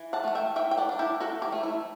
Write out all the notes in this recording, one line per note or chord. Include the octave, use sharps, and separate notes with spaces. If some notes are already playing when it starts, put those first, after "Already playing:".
Already playing: E3
F#5 A5
A3 F#5
E5 G5
E3 E5 G5
G5
D5 F#5
D4
E4 G4
E3 F#4 A4
E4 G4
A3
E4